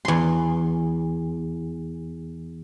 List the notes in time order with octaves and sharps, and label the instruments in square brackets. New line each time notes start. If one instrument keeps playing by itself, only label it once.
[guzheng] E2 C6